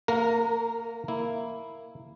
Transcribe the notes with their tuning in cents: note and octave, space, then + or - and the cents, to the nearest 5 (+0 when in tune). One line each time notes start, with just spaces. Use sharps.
A#3 -35 A#4 +0 F5 +45
A#3 -10 E4 +0